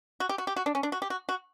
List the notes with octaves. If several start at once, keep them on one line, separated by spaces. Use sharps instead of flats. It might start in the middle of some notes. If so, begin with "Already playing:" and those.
F#4
G4
F#4
G4
F#4
D4
C#4
D4
F#4
G4
F#4
F#4